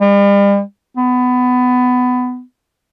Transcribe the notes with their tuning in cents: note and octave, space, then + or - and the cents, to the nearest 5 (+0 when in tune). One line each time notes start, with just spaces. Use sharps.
G3 +40
B3 +20